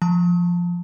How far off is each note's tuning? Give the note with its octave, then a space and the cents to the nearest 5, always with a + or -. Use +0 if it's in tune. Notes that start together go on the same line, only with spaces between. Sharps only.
F3 +0 A5 +10